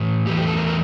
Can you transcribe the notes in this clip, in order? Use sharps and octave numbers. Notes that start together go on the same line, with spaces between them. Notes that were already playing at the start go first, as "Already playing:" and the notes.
Already playing: A2 E3 A3
E2 E3 A3 G4
G4
A4
A#4
A#4